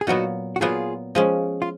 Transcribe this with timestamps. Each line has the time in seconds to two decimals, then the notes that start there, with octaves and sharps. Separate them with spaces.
0.01 G#4
0.07 A#2 F#3 B3 D#4 F#4
0.56 F#4
0.61 A#2 F#3 B3 F4 G#4
1.15 F3 G#3 C#4
1.62 F4